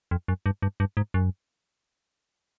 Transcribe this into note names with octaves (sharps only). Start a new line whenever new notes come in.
F2
F#2
G2
G2
G2
G#2
F#2